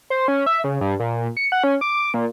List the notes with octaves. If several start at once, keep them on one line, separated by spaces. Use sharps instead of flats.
C5
C#4
E5
C#3
G2
A#2
C#7
F#5
C#4
D6
A#2